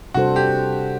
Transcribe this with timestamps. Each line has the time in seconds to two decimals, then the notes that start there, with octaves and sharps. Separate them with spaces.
0.14 C3 G3 D4 F#4 A4 C5
0.36 G4